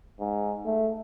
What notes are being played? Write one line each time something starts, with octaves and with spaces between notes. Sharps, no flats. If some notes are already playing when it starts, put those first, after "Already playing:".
G#2
A3